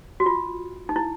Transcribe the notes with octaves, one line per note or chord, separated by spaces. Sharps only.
F#4
F4
D#4
E4